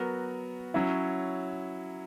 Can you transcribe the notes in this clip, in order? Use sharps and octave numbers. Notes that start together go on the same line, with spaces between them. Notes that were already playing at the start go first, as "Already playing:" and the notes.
Already playing: F#3 B3 F#4 A#4
F#3 C#4 E4